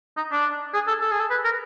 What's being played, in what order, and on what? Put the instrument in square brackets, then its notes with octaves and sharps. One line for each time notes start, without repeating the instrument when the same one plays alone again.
[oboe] D#4
D4
G#4
A4
A4
G#4
A4
B4
A#4